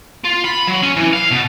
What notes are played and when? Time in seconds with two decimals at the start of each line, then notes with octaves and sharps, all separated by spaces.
0.24 F4
0.44 B5
0.67 F#3
0.83 C#4
0.97 E3
1.13 F5
1.31 B2